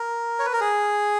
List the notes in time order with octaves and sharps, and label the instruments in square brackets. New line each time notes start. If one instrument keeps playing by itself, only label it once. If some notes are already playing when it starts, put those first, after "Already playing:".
Already playing: [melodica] A#4
C#5
B4
A#4
G#4